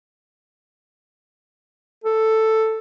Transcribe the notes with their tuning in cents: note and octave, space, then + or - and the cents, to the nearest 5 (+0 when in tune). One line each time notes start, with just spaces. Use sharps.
A4 +5